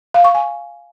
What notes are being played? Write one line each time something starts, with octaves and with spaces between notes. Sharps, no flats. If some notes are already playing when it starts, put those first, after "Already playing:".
F5
C#6
G#5